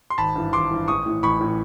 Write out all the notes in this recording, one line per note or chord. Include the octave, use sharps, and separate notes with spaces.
C6
G#1 A5 B5
G2 E3
G#1 C6 D6
G2 E3
A1 C#6 D#6
A2 E3
A1 B5 C#6
A2 E3